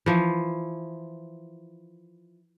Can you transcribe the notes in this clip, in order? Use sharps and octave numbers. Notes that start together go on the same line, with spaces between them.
E3 F3